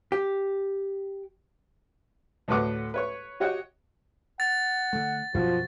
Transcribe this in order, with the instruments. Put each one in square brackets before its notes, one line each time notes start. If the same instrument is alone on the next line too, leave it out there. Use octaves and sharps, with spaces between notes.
[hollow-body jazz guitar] G4
[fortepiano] D2 A2 A3 B4 F#5 D6
B4 C#5 C#6
F#4 G4 C#5 D#5 F#5 G5
[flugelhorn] F#5 [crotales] A6
[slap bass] D3 A3
[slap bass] F#2 B2 [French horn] F3 [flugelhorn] F#4